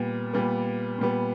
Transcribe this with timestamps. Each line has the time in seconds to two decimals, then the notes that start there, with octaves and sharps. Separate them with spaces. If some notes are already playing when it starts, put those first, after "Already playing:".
Already playing: A#2 G3 B3
0.34 A#2 G3 B3
0.99 A#2 G3 B3